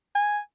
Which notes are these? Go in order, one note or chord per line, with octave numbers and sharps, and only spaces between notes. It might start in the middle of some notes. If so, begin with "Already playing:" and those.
G#5